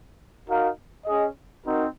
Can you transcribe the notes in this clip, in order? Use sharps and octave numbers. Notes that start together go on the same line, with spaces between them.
D#4 F#4 A#4 F5
C#4 G#4 D#5
C4 D#4 F#4 A#4